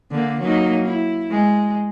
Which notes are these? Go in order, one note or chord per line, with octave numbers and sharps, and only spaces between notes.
D3 A#3
F#3 A#3 D#4
E4
G#3